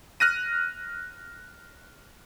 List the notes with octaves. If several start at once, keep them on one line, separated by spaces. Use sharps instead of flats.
F6 F#6 A#6 D#7